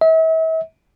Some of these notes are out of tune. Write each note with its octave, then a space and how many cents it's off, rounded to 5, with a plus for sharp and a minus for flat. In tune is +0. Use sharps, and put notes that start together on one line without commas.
E5 -40